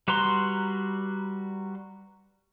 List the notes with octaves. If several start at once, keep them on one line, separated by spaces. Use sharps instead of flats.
G3 F#4 B4 A#5 C6